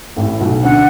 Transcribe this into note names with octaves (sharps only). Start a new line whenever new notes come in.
A1 A2
B1 B2
D2 D3 F#5